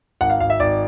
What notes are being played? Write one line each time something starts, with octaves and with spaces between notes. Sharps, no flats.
G#1 F#5
F5
G#1 F5
E5
G#1 D5